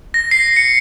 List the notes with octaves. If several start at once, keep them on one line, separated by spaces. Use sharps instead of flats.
A#6
C7
C#7